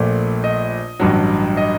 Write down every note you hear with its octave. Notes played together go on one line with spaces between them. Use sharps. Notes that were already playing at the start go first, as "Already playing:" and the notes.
Already playing: A#1 A#2 A3 D5
D#5
A1 G2 F#3
D#5